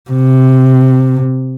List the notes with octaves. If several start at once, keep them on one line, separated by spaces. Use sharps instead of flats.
C3